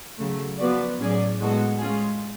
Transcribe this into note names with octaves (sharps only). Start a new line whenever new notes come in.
C#3 F#3 A3
F3 B3 F#4 B4 D5
A2 F#3 C#4 G#4 D5
A2 G#3 B3 F#4 A4
G#3 C#4 F4 G#4